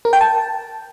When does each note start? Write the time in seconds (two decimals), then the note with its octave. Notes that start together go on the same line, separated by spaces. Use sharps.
0.05 A#4
0.13 G5
0.21 A5